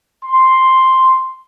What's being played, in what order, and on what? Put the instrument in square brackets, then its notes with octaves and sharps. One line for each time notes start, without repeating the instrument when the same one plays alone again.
[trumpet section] C6